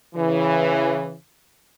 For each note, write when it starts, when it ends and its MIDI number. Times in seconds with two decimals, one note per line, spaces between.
0.15 1.14 49
0.15 1.14 52